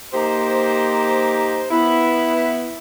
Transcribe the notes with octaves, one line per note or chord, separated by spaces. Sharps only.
A#3 D#4 G4 C5
B3 E4